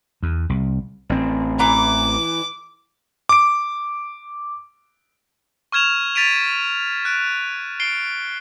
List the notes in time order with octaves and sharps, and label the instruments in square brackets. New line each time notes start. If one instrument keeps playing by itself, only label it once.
[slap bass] E2
C2
A1 C4
[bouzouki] E3 A#5 [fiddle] D6
[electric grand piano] D6 D7
[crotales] C#6 F6 G#6 E7 F7
A6 B6 D7 D#7 F7
F#6 D7
C7 D7 G7